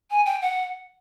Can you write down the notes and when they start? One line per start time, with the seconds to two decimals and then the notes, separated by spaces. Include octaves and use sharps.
0.11 G#5
0.26 G5
0.42 F#5